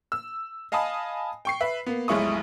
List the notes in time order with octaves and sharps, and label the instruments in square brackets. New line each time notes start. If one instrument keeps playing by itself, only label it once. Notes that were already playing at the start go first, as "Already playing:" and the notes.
[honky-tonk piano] E6
D#5 F5 G#5 A5 B5 D#6
G5 C#6 C7
B4 E5
A#3 B3
F1 B1 G#3 E4 C#6 D#6